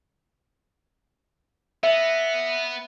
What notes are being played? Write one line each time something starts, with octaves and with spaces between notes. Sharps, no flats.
B3 E5